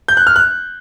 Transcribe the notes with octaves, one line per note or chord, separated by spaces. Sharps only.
G6
F#6
F6
F#6